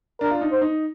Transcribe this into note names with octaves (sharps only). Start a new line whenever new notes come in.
D4 A#4
F4
D#4
C5
D#4